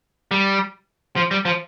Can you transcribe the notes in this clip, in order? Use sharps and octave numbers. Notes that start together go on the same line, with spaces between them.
G3
F3
G3
F3